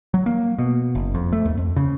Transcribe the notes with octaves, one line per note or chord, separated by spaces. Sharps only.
F#3
A#3
B2
F#1
F2
A3
D#2
F2
C#3